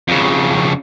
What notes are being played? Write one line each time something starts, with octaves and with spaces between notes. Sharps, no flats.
F2 C#3